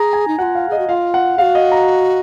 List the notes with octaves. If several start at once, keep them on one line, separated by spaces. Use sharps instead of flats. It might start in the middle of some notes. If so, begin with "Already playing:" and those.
Already playing: G#4 A#5
G#5
D#4
F4 F#4 F#5
F5
G#4 D#5
F#4
F4 F5
F#5
F#4 G#4 F5
D#5
A#5